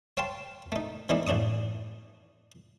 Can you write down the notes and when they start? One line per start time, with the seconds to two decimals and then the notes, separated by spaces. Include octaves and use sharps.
0.17 C#5 F5 G5 A5 C6
0.72 A3 D#4
1.09 E3 G#3 A3 B3 D4 D#4
1.27 A1 A2 D4 C#6 D#6